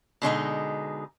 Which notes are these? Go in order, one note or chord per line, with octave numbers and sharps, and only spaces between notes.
B2 D3 G#3 D#4